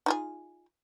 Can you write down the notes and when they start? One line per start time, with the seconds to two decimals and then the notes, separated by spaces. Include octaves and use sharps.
0.06 D#4 F4 G#4